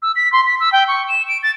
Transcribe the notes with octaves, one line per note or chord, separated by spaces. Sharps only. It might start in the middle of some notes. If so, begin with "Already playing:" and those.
E6
B6
C6
B6
E6
G5
C#6
E7
D7
A6